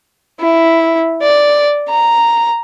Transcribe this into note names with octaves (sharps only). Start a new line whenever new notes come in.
E4
D5
A#5